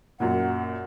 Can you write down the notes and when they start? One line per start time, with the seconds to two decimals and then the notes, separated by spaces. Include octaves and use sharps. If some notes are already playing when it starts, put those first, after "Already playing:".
0.20 F#2 A#2 F#5